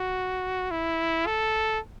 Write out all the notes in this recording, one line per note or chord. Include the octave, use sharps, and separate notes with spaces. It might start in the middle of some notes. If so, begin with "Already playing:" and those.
Already playing: F#4
E4
A4